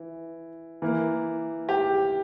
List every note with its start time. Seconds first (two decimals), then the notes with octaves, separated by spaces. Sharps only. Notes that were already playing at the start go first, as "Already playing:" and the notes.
Already playing: E3
0.82 E3 A#3
1.69 G4